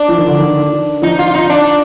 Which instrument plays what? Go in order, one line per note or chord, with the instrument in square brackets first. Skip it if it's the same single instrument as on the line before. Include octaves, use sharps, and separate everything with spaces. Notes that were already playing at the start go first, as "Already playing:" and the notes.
Already playing: [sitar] D4
[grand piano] F3
D#3
D3
D#3
[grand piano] F3 [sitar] D#4
[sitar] F4
D#4
D4